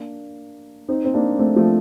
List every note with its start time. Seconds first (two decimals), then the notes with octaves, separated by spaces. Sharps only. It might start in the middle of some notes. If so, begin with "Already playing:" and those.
Already playing: A#3 D4
0.88 C4 D#4
1.05 C4
1.14 A#3 D4
1.39 A3 C4
1.56 F3 A3